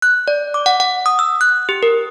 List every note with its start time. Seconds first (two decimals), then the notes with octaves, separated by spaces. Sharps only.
0.02 F#6
0.28 D5
0.54 D6
0.66 F#5
0.80 F#5
1.06 D#6
1.19 E6
1.41 F#6
1.69 G4
1.83 A#4